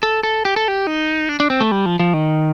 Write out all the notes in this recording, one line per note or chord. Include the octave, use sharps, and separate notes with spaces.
A4
A4
G4
A4
G4
D#4
D4
D4
C4
A3
G3
F3
F3
D#3